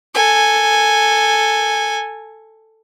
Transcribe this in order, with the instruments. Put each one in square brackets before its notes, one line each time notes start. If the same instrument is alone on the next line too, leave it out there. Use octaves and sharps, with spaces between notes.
[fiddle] A4 G#5